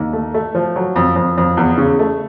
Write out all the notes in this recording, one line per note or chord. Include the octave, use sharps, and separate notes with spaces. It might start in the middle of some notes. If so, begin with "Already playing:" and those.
Already playing: D#2
A3
A3
F3
F#3
F2
F2
F2
E2
C#3
A3